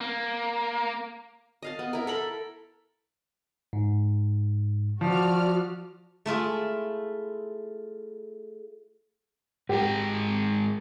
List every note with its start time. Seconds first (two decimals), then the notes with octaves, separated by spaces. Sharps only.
0.01 A#3
1.62 D#5 F5 A5
1.79 B3
1.93 E4 A#4
2.07 A4 A#4 B5
3.73 G#2
5.01 F3 F#4 D5 F6
6.26 A3 E4 F4 G#4
9.69 G#2 G#3 G4 A#4